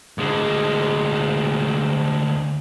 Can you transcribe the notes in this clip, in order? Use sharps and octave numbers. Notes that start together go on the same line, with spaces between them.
D2 G#3